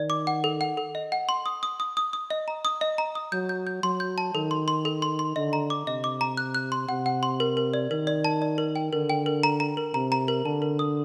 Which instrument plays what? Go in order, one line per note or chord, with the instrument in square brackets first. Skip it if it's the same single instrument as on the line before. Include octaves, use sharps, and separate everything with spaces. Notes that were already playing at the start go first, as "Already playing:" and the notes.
Already playing: [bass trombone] D#3 [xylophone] D5
[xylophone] D6
F#5
A4
F#5
A4
D#5
F#5
C6
D#6
D#6
D#6
D#6
D#6
D#5
A#5
D#6
D#5
A#5
D#6
[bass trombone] F#3 [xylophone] G6
[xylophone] G6
G6
[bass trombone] F#3 [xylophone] C6
[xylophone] G6
A5
[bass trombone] D#3 [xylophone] A4
[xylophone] C6
C6
A4
C6
C6
[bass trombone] D3 [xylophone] D#5
[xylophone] A#5
D6
[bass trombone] C3 [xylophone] D#5
[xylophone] D6
A#5
F#6
F#6
C6
[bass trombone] C3 [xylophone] F#5
[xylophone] F#5
C6
A#4
A#4
D5
[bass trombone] D#3 [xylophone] A#4
[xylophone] D5
A5
D5
A#4
G5
[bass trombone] D3 [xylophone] A#4
[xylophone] G5
A#4
A#5
A#5
A#4
[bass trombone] C3 [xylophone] A#5
[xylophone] A#5
A#4
[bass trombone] D3 [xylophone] A5
[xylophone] A#4
D#6